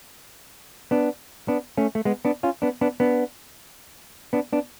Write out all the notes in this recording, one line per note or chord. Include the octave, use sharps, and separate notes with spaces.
B3 D4
B3 D4
A3 C#4
A3
G#3 B3
B3 D4
C#4 F4
B3 D4
B3 D4
B3 D4
B3 D4
B3 D4